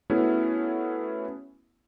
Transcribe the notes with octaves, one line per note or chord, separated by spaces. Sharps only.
A3 B3 C#4 E4 F#4 G#4